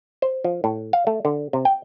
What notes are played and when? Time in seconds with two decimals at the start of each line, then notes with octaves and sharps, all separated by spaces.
0.22 C5
0.44 F3
0.64 A2
0.93 F5
1.07 A3
1.25 D3
1.53 C3
1.65 G5